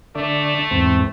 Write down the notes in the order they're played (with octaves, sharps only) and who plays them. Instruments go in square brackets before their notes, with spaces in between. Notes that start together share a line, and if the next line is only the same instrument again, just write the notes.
[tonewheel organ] D3 D5 [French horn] A3
[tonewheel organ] E2 G#2 C4